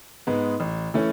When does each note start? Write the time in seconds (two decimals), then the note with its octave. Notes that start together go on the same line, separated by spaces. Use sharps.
0.27 G#2 G#3 B3
0.60 A1
0.94 E3 A3 C#4